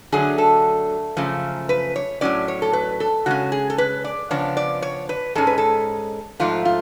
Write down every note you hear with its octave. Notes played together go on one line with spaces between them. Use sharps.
D3 F#3 A3 G#4
A4
F#2 C#3 F3 A3
B4
C#5
A2 F#3 C#4 D5
C#5
A4
B4
A4
C#3 G#3 C#4 F#4
G#4
A4
B4
D5
C#3 F3 B3 D4 C#5
D5
C#5
B4
G#2 G#3 C#4 A4
B4
A4
G#2 F3 A3 F4
F4